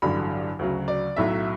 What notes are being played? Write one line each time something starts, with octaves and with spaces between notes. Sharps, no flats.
A1 G2 D3 F#3 B5
D2 C#3 F#3
D5
B1 A2 F#3 E5